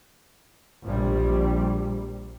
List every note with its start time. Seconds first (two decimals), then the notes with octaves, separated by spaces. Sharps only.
0.83 A#1 G3